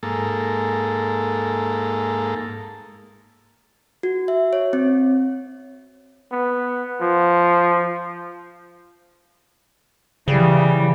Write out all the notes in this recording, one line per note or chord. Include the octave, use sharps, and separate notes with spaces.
G#2 A#3 A4
F#4
E5
C#5
C4
B3
F3
C#3 E3 G3